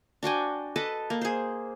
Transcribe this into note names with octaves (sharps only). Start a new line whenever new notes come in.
D4 F#4 G5 G#5
A4 B4 D#5 A5
A#3
G#4 C5